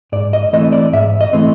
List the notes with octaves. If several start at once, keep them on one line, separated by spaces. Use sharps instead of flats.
G#2 D5
D#5
E3 A3 C4 D#5
D5
G#2 E5
D#5
E3 A3 C4